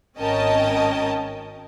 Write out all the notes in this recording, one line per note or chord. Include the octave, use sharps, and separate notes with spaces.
G#1 C#4 A#4 D#5 G5 A5